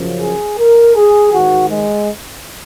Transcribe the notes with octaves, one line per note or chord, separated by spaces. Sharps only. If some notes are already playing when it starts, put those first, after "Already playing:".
Already playing: F#2 C#3 F3
G#4
A#4
G#4
G#2 D#3 F#4
G#3